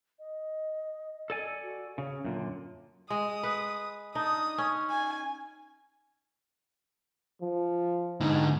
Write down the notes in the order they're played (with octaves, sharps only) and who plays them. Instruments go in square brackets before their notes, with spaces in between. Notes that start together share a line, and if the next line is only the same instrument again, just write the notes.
[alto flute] D#5
[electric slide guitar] A4 D5 G#5
[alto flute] F#4
[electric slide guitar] C#3 [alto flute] C#5
[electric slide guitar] F#2 A#2 D3
[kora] G#3 [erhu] D#6
[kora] B4
[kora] D4 D#4 [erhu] D#6
[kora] C#4
[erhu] G#5
[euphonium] F3
[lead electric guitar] G#2 D3 [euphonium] D#4